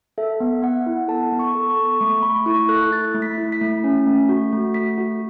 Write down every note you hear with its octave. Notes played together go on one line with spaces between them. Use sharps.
A4 E5
B3
B3 F#5
E4
A4 A5
B3
C#6
A4
C#6
A4
A3 C#6
A3 B5
E4 C#6
A4 F#6
E4 A6
A3
B6
E4
B6
A3
C#4
A3
F#4
A3
A3 B6
F#4